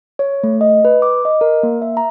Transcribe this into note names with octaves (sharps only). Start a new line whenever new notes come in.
C#5
A3
D#5
B4
D6
D#5
A#4
A#3
E5
A#5